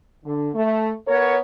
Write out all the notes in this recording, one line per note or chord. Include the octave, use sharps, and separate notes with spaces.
D3
A3
B3 A#4 C#5